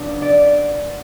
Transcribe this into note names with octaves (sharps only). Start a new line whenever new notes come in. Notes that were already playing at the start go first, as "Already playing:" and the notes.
Already playing: C#3 F#3 B3 D4
D5